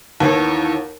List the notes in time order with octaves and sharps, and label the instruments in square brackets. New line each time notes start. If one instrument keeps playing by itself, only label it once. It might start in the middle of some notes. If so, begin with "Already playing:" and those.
[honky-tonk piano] D#2 [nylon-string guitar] E3 B3 [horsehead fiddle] A4 C#5